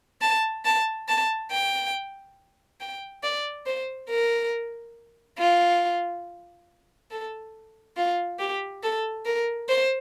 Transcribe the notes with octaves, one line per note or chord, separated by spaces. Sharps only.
A5
A5
A5
G5
G5
D5
C5
A#4
F4
A4
F4
G4
A4
A#4
C5